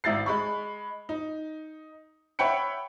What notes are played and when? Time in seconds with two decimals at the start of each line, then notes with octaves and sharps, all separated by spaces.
0.04 G#1 E4 A6 C7
0.26 G#3 B5 C#6
1.09 D#4
2.39 C#5 E5 F#5 G5 B5 C#7